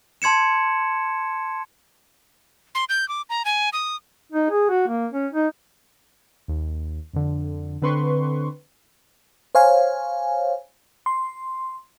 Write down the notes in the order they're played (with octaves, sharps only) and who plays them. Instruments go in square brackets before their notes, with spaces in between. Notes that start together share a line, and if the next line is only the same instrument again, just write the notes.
[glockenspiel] A5 C6 G#6 C#7 E7
[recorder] C6
G6
D6
A#5
G#5
D#6
[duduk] D#4
G#4
F#4
A#3
C#4
D#4
[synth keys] D#2
F2 D3
D3 C4 B4 C6 C#6
[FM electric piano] C5 C#5 F5 G#5
C6